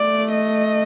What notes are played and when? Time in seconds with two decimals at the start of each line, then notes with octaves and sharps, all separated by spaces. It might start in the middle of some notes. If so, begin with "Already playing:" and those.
Already playing: A3 D5
0.32 D#5